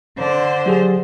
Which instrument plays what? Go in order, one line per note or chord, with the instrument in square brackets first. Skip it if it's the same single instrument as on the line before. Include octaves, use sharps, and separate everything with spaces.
[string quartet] D3 C5
[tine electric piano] F#3 G4 G#4